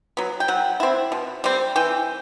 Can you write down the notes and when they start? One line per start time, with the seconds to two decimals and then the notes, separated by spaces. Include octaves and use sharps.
0.17 F#3 B3
0.40 G5
0.48 F#3 F#5
0.80 C4 E4
1.12 B2
1.44 G3 C4
1.76 E3 G5